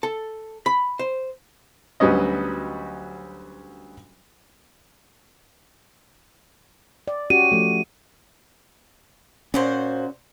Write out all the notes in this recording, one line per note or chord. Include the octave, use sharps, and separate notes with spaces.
A4
B5
C5
D2 F#3 G3 B3 C#4 D#5
D5
C#4 F#4 G4 D#7
F3 A3
A#2 C#4 F#4 C5